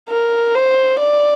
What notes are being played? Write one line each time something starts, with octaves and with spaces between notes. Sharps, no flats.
A#4
C5
D5